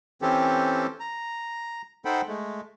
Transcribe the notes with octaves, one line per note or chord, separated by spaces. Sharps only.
E3 C4 C#4 G4 A4
A#5
D#4 A4 C5 F#5 G5 B5
G#3 A3